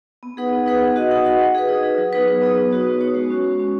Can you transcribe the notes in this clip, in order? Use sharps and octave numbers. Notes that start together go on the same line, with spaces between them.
B3
D#4 G#4 B4 F#5
B3
D#4 G#4 B4 F#5
D#4
F#4 D#5 F#5
D#4
F#4 D#5 F#5
D#4
G#4 B4
D#4
G#4 B4
F#3
B3 D#4 G#4 B4
F#3
B3 D#4 G#4 B4
B3
D#4 F#4 C#5
B3
D#4 F#4 C#5
G#3
C#4 F#4
G#3
C#4 F#4